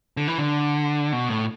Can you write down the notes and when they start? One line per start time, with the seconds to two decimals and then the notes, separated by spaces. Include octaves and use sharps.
0.17 D3
0.28 E3
0.38 D3
1.13 B2
1.29 A2